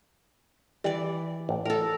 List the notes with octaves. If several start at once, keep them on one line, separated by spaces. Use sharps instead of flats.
E3 G3 D5
A1
A2 A4 A#4